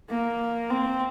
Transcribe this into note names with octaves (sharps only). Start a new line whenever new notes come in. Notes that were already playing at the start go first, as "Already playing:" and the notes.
A#3
C4